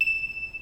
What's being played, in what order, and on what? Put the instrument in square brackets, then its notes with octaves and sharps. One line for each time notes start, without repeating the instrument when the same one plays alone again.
[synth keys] E7